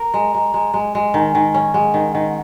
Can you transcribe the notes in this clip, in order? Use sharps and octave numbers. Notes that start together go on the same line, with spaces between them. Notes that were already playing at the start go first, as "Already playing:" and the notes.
Already playing: A#4 A#5
G#3
G#3
G#3
G#3
G#3
D#3 G#5 A#5
D#3
C#4
G#3 F#5
D#3
D#3